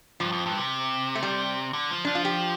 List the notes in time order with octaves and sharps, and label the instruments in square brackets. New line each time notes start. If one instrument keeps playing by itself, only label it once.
[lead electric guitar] G2 [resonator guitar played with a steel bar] F3
[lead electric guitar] F2
G2
C3
[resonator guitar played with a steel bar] A3
G3
[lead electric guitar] D3
F3
[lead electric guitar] F3 [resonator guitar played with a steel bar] D4
[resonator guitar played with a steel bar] F4
G4